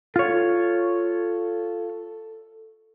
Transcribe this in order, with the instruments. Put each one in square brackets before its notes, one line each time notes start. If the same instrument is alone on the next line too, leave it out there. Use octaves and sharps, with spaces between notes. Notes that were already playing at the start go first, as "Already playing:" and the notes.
[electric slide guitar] F4 C#5 [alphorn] A4